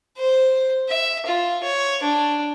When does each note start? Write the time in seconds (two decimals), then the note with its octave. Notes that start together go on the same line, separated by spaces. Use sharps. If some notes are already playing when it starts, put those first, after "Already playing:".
0.17 C5
0.89 E5
1.26 F4
1.63 C#5
2.03 D4